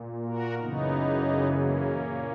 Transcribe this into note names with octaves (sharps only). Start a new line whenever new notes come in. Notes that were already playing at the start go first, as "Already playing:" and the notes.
Already playing: A#2
F#4 A#4
F#2 C#3 E3 B3 D#4
A#3 C#4
A#2